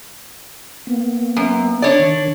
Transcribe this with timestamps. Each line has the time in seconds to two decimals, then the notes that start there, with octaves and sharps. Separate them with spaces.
0.87 A#3 B3
1.37 F#2
1.82 D4 C#5 D5
1.99 D#3